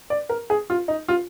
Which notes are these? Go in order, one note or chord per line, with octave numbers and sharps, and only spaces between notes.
D5
A#4
G#4
F4
D#4
F4